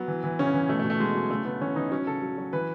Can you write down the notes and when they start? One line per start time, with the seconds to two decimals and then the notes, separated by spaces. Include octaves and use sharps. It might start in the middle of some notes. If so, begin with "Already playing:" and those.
Already playing: F#3 B3
0.08 E3
0.24 E3
0.39 C#3 C#4
0.54 E3
0.69 B2 A3
0.79 A3
0.85 B2
0.90 A3
1.00 B2 G#3
1.15 F#3
1.30 C#3 A3
1.45 C#3 B3
1.61 E3 C#4
1.76 E3 D#4
1.92 F#3 C#4
2.07 C#3 A4
2.22 F#3
2.38 F#3
2.53 E3 B4